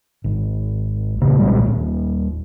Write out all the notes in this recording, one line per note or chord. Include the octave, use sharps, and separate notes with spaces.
G#1
E1 A#2 C#3 B3
B1 A#2 G3 G#3
D#1